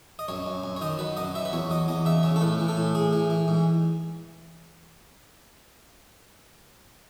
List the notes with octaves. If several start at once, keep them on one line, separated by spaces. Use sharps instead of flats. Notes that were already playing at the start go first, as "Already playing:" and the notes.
D#5
F#2 C#5
F#2
F#2
C#5
D#3 D#5
F#3 B4
F#2 D#5
F#3 E5
B4
E2 C#5
F#3 D#5
E2 D#5
C#3 E5
C#3 C#5
A4
A2 B4
E3
A4
A2
A2 G#4
E3
E3
G#2